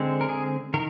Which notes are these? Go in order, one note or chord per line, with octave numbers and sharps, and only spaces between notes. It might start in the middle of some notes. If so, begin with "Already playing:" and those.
Already playing: D3 G#3 C4
A#4
G#4
D#3 A#4